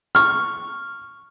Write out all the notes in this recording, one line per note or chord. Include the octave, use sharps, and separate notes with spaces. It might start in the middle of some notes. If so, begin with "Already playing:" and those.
C#6 F6